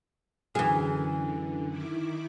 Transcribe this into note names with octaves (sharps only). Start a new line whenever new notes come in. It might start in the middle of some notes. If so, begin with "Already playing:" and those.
F#2 D3 E3 G#4
D#3 E4 D6